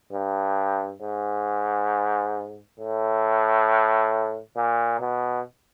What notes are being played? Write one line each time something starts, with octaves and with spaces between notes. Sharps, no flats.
G2
G#2
A2
A#2
B2